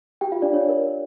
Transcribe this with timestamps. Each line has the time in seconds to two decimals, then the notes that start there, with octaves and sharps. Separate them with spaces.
0.21 G4 G5
0.32 F4 F5
0.42 D4 D5
0.54 C#5
0.69 A#4